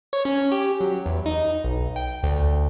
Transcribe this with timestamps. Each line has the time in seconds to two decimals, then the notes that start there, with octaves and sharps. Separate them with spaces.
0.13 C#5
0.25 C#4
0.52 G4
0.80 F#3
1.06 E2
1.26 D#4
1.64 B1
1.96 G5
2.23 D2